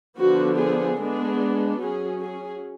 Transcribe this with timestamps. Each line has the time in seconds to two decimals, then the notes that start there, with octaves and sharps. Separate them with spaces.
0.20 D3 F3 B3 D4 F#4
0.59 G#4
0.99 G#3 B3 D4 G#4
1.81 F#3 C#4 G#4
2.21 G#4